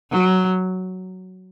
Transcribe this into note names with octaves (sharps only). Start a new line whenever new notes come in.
F#3